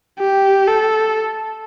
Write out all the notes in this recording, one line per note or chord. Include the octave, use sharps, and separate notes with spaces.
G4
A4